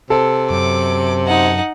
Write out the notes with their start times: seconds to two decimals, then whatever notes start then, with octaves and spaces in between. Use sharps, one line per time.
0.10 C3 A4
0.50 F#2 D6
1.27 D#4 F#5